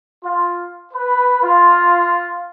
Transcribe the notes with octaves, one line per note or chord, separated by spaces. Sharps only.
F4
B4
F4